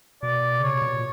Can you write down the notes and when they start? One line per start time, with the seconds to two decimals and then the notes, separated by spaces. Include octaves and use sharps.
0.22 B2 D5
0.59 C#3 C#5
0.71 C3
0.82 B2
0.93 A#2